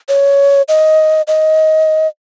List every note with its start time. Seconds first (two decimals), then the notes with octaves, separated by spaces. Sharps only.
0.09 C#5
0.68 D#5
1.27 D#5